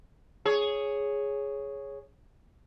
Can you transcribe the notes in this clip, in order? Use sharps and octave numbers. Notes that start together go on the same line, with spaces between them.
G#4 C#5